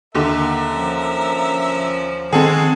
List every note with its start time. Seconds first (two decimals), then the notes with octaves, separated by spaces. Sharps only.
0.15 D#2 D3 A#4 E5
0.72 F3 C#4
2.33 D#3 G#3 C4 F#4 G#4 A4